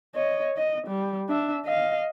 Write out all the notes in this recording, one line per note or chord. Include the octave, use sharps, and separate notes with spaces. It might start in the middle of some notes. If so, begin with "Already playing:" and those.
C#5 D#5
D#5
G3
D4 E5
D#5 F5